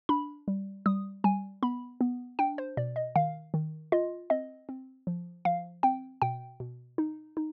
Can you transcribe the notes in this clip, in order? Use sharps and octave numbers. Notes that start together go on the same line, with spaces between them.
D4 B5
G3
G3 D#6
G3 G#5
B3 B5
B3
D4 G5
C5
B2 D5
D#5
D#3 F5
D#3
F4 D#5
C4 D#5
C4
F3
F3 F5
C4 G5
B2 G5
B2
D#4
D#4